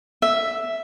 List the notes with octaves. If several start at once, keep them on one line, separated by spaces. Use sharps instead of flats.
E5